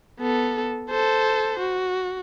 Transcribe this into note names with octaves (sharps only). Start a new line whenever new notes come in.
B3 A4
A4 C5
F#4